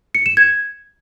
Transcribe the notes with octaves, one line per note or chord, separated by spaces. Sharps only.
C#7
E7
G#6